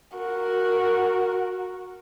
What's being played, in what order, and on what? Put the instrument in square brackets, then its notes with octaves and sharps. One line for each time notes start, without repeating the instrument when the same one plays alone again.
[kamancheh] F#4 A#4